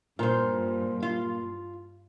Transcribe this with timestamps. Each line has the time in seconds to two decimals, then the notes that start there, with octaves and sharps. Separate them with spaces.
0.19 G2 A#2 F4 C5
1.03 F4